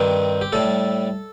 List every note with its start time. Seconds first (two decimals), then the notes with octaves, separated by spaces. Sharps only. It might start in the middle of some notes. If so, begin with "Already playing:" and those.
Already playing: G2 D#3 G3 C4
0.41 G4
0.53 A2 G3 A4